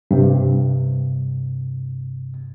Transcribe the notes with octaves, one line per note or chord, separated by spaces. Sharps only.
G2 C3